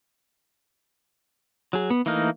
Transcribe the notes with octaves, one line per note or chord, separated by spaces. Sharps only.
F#3 G#4
B3
E3 A3 A#3 D#4 F6